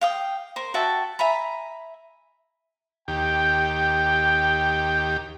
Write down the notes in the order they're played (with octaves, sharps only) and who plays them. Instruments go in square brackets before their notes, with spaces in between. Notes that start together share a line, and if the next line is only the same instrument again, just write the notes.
[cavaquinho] F5 G5 D#6
A#4 C5
F#4 E5 G5 A5
E5 G#5 A#5 B5
[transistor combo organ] D#2 G4 [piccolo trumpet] G5